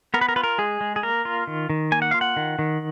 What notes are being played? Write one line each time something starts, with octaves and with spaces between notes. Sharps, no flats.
B3 A#4
B4
A#4
F4 B4
A#4
G#3 G#4
G#3
G#4
A#3 A#4
F4
D#3
D#3
A#3 G#5
F#5
F4 F5
F#5
D#3
D#3